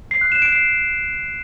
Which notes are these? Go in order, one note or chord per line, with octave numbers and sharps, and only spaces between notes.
C7
F#6
E7
D7
C7